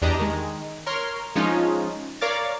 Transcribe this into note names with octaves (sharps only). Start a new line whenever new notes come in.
E2 D4 G4 D#5 A#5
D#3 G#3
A#4 C#5 C6 F6
F3 G#3 C#4 D#4 F4
A#4 C#5 D5 F5 D6 A6